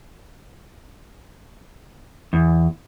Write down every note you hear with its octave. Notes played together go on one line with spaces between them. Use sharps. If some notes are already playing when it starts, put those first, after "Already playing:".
E2